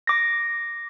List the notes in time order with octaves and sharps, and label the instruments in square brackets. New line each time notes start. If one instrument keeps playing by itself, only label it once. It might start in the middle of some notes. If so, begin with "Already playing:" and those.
[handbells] D6 A#6